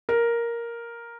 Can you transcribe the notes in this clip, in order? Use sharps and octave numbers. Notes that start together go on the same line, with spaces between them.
A#4